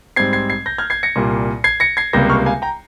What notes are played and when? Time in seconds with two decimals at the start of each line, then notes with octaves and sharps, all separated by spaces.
0.16 G#2 G3 C4 G#6 C7
0.33 G#6 C7
0.50 G#6 C7
0.66 G6 A#6
0.78 F6 G#6
0.90 G#6 C7
1.03 A#6 C#7
1.16 C2 A#2 G3 A#3
1.64 G#6 C7
1.80 A#6 C#7
1.97 G#6 C7
2.13 C#2 C3 G3 A#3 G6 A#6
2.29 C#6 F6
2.46 F5 G#5
2.62 G5 A#5